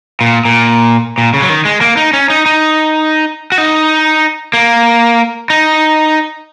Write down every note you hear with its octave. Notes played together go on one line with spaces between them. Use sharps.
A#2
A#2
A#2
C#3
F#3
D#3
G#3
A#3
D#4
C#4
D#4
D#4
F#4
D#4
A#3
D#4